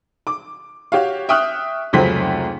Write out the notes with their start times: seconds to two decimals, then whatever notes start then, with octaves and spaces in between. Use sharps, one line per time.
0.27 D6
0.92 F#4 G4 C#5 F5
1.29 E5 G5 C#6 D#6 F6 F#6
1.93 F1 C#2 F#3 C5 B6